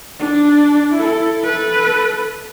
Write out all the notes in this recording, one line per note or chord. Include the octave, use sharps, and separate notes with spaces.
D4
E4 A4
A4 B4